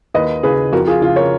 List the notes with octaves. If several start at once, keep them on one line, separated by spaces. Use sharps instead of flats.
D#2 B4 D#5
C#3 G#4 B4
F2 F#4 A#4
F4 G#4
C#3 F4
A#4 C#5